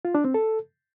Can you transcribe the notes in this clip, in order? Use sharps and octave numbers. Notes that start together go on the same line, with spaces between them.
F4
D4
C4
A4